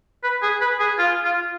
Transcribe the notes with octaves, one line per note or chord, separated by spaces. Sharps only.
B4
G#4
B4
G#4
F4
F4